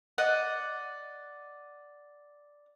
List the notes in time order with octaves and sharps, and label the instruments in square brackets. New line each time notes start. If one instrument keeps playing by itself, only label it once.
[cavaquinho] D5 D#5 F#5